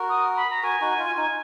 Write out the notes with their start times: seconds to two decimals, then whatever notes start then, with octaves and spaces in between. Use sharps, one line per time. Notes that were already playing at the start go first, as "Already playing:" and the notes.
Already playing: F#4 A#4
0.09 D#6
0.36 B5
0.50 A#5
0.63 F#4 A#4 G#5
0.81 D#4 F#4
0.99 F4
1.17 D#4 G#5